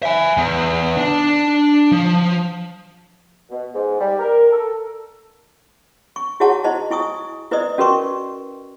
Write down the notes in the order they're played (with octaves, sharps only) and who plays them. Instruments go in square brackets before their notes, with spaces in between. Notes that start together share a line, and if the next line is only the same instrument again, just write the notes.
[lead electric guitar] E5 G#5
E2
D4 D5
F3
[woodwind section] B2
G#2
G3
A#4
A4
[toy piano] C#6
E4 F#4 G#4 C#5 F#5 A5
E4 C5 D#5 A5
E4 G#5 C#6 D#6
E4 B4 C5 D5 D#5 D#6
C#4 F#4 A#4 B4 C6 C#6